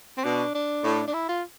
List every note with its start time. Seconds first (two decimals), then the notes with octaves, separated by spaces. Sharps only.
0.17 C4
0.24 B2 D4
0.55 D4
0.84 A2
1.08 D4
1.14 E4
1.29 F4